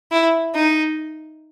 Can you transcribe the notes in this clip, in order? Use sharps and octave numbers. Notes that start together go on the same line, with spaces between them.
E4
D#4